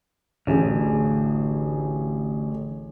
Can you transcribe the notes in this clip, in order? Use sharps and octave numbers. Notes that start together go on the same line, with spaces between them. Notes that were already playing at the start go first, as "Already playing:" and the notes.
A1 D2 G#4